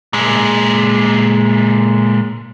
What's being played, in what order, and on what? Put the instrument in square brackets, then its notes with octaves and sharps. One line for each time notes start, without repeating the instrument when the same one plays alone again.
[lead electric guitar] A#2 G#3